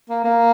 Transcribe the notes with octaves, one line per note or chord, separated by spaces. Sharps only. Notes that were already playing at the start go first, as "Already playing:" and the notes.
A#3
A#3